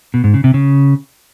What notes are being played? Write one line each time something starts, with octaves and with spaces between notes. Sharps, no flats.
B2
G#2
C#3
C3
C#3